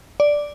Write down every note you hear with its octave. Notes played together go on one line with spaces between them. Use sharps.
D5